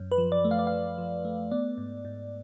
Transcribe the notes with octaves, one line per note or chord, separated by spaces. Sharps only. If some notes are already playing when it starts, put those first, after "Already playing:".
Already playing: F#2
B4
F3
D5
A3
F5
D5
F3 F5
F3
A3
B3 D5
G#2
G#2